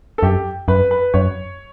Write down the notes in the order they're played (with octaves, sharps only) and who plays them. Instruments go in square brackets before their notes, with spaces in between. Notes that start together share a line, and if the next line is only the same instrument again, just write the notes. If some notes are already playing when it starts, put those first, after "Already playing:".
[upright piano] A4
[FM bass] F#2 [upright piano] G4
[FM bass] F#2 [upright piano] B4
[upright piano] B4
[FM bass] F#2 [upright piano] C#5